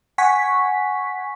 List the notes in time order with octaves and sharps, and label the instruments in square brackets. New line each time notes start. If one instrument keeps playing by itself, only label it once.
[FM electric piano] F#5 G#5 C#6 B6